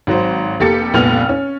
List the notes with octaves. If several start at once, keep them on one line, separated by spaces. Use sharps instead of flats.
G#1 F#3 C5
F1 A#3 G4 A4 A6 C#7
F1 C#2 A#2 B3 F6 F7
C#4